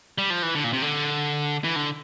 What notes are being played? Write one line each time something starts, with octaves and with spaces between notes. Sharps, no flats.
G3
F3
E3
D3
A#2
C3
D3
E3
D3